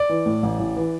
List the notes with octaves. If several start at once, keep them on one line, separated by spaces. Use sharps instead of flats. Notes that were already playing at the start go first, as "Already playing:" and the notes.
Already playing: D5
E3
A2
A1
A1
E3